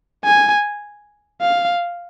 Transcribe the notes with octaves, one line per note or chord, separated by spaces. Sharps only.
G#5
F5